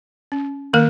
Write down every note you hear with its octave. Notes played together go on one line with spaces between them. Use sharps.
C#4
D#3 A#3 A#4